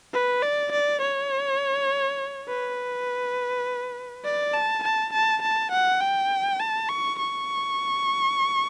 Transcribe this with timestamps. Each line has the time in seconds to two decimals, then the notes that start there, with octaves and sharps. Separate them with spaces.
0.14 B4
0.43 D5
0.72 D5
1.01 C#5
2.49 B4
4.25 D5
4.54 A5
4.83 A5
5.13 A5
5.42 A5
5.72 F#5
6.01 G5
6.60 A5
6.89 C#6
7.19 C#6